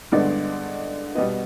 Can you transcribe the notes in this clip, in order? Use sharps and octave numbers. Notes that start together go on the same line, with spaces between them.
G2 D3 G#3 B3 D5
B2 G3 B3 D#5